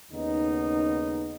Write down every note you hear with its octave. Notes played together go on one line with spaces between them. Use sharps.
D#2 C#3 B3 D#4